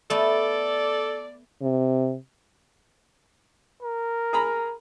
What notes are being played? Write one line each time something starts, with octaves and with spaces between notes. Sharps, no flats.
A3 B3 A4 D5
C3
A#4
G#4 A#5 B5